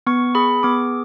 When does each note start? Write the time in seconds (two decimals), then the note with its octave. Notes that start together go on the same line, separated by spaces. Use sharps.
0.07 B3 C#6
0.35 G#4 B5
0.63 B3 D6